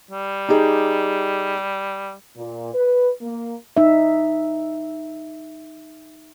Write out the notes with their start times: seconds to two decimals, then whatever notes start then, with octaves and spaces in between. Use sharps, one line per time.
0.11 G3
0.49 D#4 G4 G#4
2.36 A#2
2.73 B4
3.21 A#3
3.77 D#4 E5